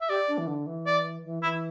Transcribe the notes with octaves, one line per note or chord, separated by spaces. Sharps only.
E5
G4 D5
D4
E3
D3
E3
D5
E3
E3 E4